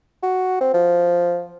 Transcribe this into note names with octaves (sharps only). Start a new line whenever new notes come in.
F#4
C4
F3